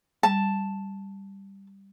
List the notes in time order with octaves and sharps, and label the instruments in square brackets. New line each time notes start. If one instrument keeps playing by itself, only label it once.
[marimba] G3 [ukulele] A5